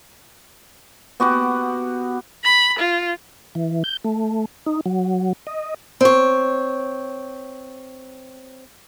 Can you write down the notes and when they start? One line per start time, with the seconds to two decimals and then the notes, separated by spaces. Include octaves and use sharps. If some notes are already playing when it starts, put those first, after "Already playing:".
1.20 B3 F#4 G4 F#5
2.44 B5
2.79 F4
3.55 E3
3.84 G6
4.04 A3
4.66 D#4
4.86 F#3
5.47 D#5
6.01 C4 C#5